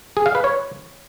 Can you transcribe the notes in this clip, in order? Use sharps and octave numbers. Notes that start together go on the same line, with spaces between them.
G#4
F5
B4
C#5